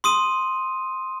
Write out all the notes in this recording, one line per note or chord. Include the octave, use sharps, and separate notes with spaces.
C6 D#6 D#7